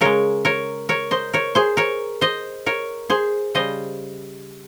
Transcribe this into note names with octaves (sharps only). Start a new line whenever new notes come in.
C#3 G#3 A#4 C#5
A#4 C#5
A#4 C#5
C5 D#5
A#4 C#5
G#4 C5
A#4 C#5
C5 D#5
A#4 C#5
G#4 C5
C#3 G3 C5 D#5